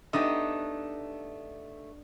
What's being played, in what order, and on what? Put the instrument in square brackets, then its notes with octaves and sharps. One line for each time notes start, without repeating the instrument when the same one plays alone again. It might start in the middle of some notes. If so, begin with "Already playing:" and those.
[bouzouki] A3 [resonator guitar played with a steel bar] B3 D#4 G4 [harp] D4 D#6